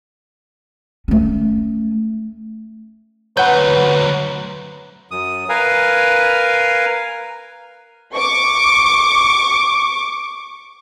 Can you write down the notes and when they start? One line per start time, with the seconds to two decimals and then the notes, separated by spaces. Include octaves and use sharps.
1.08 A3 C#4
3.37 D2 F#3 B4 C#5 F#5 G6
5.11 F#2 D#6
5.49 A#4 B4 F5 G#5
8.15 C#6 D6